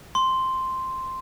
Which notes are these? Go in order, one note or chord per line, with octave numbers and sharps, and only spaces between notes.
C6